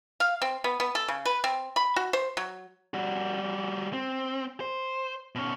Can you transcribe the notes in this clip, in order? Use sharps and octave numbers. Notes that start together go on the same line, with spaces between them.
F5
C4
B3
B3
A4
C#3
B4
C4
B5
F#4
C5
F#3
G3 F#4
C4
C5
B2 C#4